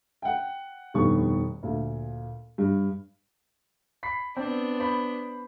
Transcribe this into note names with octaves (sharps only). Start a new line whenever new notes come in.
F#5 G5
F1 G2 B2 D#3 C#6
D2 A#2
G2
B5 B6 C7
B3 C4 D4
C5 B5